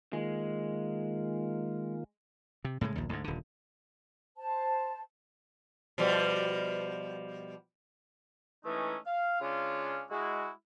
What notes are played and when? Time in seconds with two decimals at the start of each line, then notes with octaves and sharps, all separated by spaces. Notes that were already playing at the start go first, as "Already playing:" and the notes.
0.13 D#3 G#3 A#3 F4
2.64 C3
2.81 A2 C#3 E3 G#3
2.96 A#1 D#2
3.09 D2 G#2
3.24 D#1 D3
4.38 C5 A5
5.98 B2 F3 G3
8.65 E3 G#3 A3 C#4 D#4
9.06 F5
9.41 C#3 G#3 C#4 D4 F4
10.11 G#3 E4 F#4